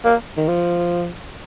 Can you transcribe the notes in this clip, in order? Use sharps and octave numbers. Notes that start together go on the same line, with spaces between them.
A#3
D#3
F3